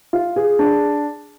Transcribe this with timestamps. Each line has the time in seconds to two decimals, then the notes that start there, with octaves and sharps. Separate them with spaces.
0.13 F4
0.36 G#4
0.59 D4